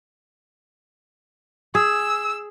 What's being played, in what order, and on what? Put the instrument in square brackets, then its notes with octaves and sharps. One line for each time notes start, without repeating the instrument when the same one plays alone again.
[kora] G#4 [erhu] E6